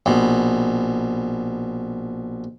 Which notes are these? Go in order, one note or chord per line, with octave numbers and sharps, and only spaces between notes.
A#1 B2